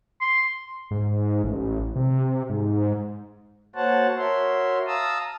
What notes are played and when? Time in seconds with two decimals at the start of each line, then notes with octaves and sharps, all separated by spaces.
0.21 C6
0.91 G#2
1.44 A1
1.96 C3
2.49 G#2
3.76 A#3 F#4 C5 C#5 F#5 A5
4.17 F#4 A#4 C#5 E5 C6
4.87 F5 A5 A#5 D#6 E6